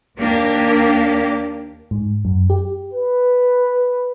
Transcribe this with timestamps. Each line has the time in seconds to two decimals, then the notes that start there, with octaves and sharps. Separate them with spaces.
0.18 D#2 A#3 D4 G4 A#4
1.91 G#2
2.25 F#2
2.50 G4
2.93 B4